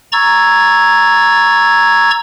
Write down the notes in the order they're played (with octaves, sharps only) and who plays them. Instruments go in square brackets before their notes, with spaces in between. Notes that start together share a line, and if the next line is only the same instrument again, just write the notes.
[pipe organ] A#5 C#6 E6 G#6 A6